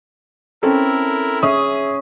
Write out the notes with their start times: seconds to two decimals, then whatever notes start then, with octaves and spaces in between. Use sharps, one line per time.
0.63 C4 C#4 E4 A4 A#4
1.43 C#4 G#4 E5 D#6